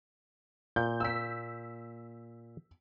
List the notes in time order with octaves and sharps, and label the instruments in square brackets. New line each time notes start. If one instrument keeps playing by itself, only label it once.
[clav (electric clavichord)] A#2 [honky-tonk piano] G6
[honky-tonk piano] E6 B6